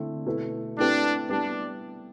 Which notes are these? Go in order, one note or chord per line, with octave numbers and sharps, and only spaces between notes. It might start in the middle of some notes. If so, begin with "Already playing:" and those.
Already playing: D3 A3 C4 E4
B2 A3 E4 B4
A3 C4 D4 E4 G4 B4
G3 B3 D4 E4 G4